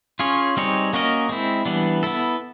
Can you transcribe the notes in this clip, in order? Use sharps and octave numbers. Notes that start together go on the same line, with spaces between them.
C#4 F4 G#4 C#5
G3 C4 D#4 G#4 C#5
A#3 C#4 F#4 A#4 D#5
G#3 C4 E4
E3 G3 B3 D4
B3 E4 A4